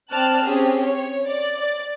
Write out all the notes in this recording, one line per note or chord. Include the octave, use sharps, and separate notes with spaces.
C4 D5 A5 F6 F#6
C4 C#4 G4 G#4
C#5
D5
D5